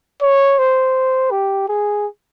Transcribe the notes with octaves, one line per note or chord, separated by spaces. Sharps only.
C#5
C5
G4
G#4